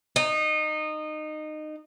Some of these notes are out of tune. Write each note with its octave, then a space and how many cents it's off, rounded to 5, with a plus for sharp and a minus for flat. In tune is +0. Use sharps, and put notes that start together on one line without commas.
D#4 -20